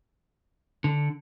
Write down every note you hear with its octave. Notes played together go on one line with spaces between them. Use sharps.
D3